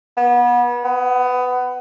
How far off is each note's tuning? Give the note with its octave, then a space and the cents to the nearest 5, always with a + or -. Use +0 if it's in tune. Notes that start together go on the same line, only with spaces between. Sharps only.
B3 -30
B3 +20